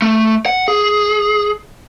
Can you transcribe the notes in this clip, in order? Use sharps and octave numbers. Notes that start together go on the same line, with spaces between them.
A3
F#5
G#4